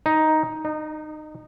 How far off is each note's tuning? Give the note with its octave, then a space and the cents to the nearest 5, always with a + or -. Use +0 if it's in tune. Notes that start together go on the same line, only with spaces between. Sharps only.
D#4 +5
D#4 -25